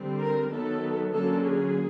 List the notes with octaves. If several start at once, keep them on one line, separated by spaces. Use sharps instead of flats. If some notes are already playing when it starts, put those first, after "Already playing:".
Already playing: D3 G3 C4
A#4
D#3 F#3 B3 A4
D3 F#3 A#3 C#4 A4
G#4